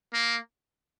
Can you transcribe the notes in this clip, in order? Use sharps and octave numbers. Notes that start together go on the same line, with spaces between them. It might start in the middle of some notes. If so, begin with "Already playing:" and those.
A#3